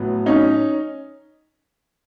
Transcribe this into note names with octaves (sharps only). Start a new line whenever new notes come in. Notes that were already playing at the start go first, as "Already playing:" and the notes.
Already playing: A2 F#3 B3
C#4 D#4